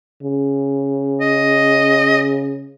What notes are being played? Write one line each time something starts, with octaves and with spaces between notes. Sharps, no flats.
C#3
D#5